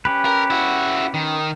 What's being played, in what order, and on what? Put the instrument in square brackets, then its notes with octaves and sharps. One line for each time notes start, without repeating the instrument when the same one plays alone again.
[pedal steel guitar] C#4 G4 B4
[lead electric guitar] A#4
E4 F#4
D#3